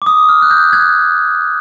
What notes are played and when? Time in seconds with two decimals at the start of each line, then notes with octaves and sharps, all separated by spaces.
0.02 D6
0.06 D#6
0.29 F6
0.42 F#6
0.51 G6
0.73 F#6 G#6